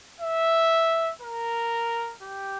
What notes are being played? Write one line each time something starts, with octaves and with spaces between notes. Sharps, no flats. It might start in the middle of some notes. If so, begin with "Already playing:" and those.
E5
A#4
G4